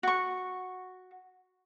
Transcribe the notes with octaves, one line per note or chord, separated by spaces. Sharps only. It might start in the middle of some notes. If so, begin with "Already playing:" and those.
F#4 C#6